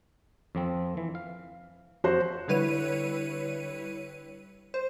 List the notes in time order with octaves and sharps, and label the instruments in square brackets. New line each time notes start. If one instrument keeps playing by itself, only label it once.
[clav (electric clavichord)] F2 F3 C4
E3
F5
[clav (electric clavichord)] F2 [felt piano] F#4 C5
[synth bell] D3 G3 E4 B4 C#5 D#7
C5